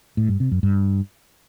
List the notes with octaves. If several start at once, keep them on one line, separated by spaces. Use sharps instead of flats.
A2
G2
C3
F#2
G2